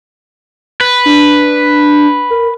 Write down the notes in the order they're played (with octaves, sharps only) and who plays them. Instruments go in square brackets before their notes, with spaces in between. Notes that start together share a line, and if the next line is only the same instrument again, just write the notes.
[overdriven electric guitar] B4
[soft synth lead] D4
A#4